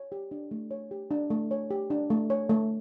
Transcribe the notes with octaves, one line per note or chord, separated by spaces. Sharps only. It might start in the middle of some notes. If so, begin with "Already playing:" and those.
Already playing: C#5
G4
D4
A3
C#5
G4
D4
A3
C#5
G4
D4
A3
C#5
A3